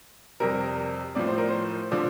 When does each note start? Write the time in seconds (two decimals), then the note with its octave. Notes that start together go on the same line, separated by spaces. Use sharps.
0.40 F2 C3 G3 A#4
1.15 A2 F3 D5
1.27 C5
1.38 A#4
1.49 C5
1.91 D3 F3 D5